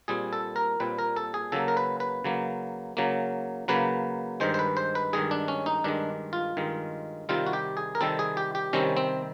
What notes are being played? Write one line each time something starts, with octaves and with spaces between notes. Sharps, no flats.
A#2 G3 C4 G#4
A4
A#4
A#2 G3 C4 B4
A#4
A4
G#4
C#3 F#3 A#3 A4
A#4
B4
B4
C#3 F#3 A#3
C#3 F#3 A#3
C#3 F#3 A#3 B4
G2 D#3 G#3 C5
C5
B4
C5
B4
G2 D#3 G#3 G#4
D4
C#4
D#4
G2 D#3 G#3 D4
F4
G2 D#3 G#3
C3 D#3 G3 C4 F4
F#4
G4
G#4
A#4
C3 D#3 G3 C4 A4
G#4
G4
G4
C3 D#3 G3 C4 C#4
C4